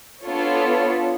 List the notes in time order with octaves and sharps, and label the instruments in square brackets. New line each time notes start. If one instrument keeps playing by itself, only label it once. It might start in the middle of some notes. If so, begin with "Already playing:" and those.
[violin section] B3 D4 F4 A4 C#5